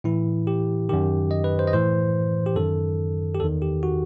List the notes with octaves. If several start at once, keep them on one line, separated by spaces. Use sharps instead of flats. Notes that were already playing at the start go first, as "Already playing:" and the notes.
A2 E3 E4
G4
F#2 D#3 G4
D#5
B4
C5
D#5
A2 E3 C5
G4
F#2 D#3 A4
G4
E2 D#3 A4
G4
F#4